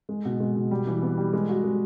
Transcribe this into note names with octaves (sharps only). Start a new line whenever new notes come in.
G#3
B2
G#3
B2
G3
E3
B3
G3
G#3
F#4
G#3